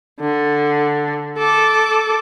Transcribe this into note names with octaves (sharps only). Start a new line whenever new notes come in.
D3
A4 D6